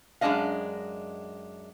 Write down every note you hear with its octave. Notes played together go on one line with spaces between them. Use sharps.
F#2 G#3 B3 D4 D#5 F5